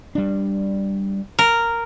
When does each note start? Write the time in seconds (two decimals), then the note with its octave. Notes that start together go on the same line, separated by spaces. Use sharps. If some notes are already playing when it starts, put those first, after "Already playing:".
0.15 G3 D4
1.39 A#4